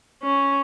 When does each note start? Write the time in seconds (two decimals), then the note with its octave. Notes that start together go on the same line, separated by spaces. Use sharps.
0.23 C#4